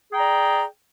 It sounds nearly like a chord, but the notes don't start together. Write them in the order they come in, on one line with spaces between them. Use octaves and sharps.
G#4 G5 A#5 D5